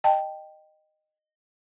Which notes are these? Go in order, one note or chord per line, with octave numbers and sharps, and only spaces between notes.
D#5 G5 A5